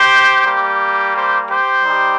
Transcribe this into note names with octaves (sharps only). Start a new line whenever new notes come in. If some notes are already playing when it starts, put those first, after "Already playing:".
Already playing: G4 C5
G3 A#3 G4
G4 C5
G4 C5
G3 D#4 G4